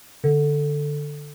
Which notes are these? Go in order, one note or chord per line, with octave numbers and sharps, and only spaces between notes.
D3